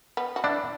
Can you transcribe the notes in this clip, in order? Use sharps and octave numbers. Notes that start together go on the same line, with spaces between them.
B3
F#4
D4 E4